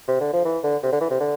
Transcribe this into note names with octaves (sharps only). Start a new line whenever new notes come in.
C3
D3
F3
E3
D3
C3
D3
E3
C3
D3